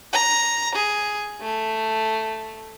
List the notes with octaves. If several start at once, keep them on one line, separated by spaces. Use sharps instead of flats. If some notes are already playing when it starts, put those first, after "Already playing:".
A#5
G#4
A3